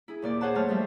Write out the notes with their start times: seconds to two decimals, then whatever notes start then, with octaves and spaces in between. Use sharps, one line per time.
0.08 E4 G#4
0.22 D#2 A#2 D5
0.41 G#4 C5 C#5 F#5 A5
0.55 F#2 A3 C#5 A5 F6
0.69 F3 G3 C5 E5